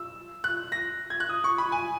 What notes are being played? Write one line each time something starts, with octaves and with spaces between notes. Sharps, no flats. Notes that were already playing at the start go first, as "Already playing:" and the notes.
Already playing: E6
F#6
A#6
G#6
F#6
D#6
C#6
B5
G#5